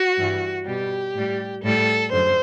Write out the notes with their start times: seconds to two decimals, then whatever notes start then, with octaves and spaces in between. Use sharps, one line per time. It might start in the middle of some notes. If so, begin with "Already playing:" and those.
Already playing: F#4
0.17 G2 E3 G3
0.66 B2 G3 G4
1.15 A2 G3
1.63 A2 G3 A4
2.12 F#2 D3 C5